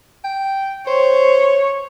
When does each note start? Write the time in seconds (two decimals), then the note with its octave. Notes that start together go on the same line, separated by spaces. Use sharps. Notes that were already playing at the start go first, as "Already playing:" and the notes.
0.24 G5
0.87 C5 C#5